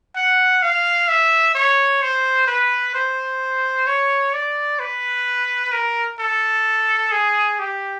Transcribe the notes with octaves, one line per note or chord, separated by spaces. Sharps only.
F#5
F5
E5
C#5
C5
B4
C5
C#5
D5
B4
A#4
A4
G#4
G4